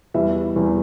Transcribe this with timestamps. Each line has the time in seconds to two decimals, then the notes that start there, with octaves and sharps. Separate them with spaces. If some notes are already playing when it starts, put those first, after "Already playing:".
0.14 E2 E3 G3 E5
0.56 E2 E3 G3